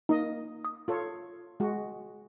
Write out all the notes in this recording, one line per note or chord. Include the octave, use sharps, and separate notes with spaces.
A#3 D#4 D#5
D#6
F4 A4 C#5
G#3 F#4